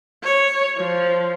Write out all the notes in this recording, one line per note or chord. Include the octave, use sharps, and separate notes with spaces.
C#5
F3